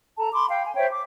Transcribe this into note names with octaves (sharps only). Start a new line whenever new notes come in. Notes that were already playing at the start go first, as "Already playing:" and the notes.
A4 A5 A#5
B5 C6 D6
F5 G5
G#5
C5 C#5 E5 G5
D6